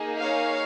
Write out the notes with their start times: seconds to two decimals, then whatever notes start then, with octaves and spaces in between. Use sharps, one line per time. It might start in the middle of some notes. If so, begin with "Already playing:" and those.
Already playing: A#3 D#4 G#4
0.20 C#5 F5